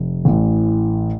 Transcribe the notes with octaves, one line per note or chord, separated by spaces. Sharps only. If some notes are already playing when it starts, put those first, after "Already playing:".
Already playing: F1
A1 A2 E3